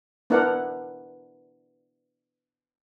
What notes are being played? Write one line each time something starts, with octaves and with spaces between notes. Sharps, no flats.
B3 D4 E4 A#4 F#5